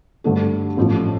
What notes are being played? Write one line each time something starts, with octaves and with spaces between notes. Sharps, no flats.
G2 D3 A3 D4 A4
A1 A2 F3